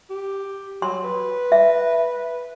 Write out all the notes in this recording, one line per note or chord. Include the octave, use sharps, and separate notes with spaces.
G4
F#3 C6
B4
E5